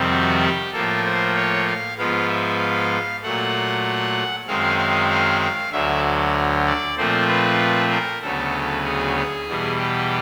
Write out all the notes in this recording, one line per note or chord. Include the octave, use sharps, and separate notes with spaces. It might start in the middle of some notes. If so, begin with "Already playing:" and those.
Already playing: F2 C3 D#3 G3 C4
F#4
G4
A2 F3 A#3 A4
C5
C#5
F5
G#2 F3 G#3 B3 F5
E5
F5
A#2 F#3 A3 F#5
F#2 D#3 G#3 C4 F5
F5
F5
F5
D2 D3 F#3 E5
D5
A#2 F3 A3 C4 C5
B4
A#4
D2 C#3 F#3 B3 A4
G#4
G#4
E2 B2 G3
G4